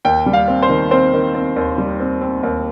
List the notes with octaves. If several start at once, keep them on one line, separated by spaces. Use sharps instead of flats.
D#2 G5
G3
F5
C4
C5
D#3
C4 C5
D#3
C4
D#2
G3
C4
C4
D#2